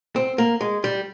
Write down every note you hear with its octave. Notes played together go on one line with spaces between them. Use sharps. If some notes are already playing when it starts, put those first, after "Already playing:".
C4
A#3
G#3
G3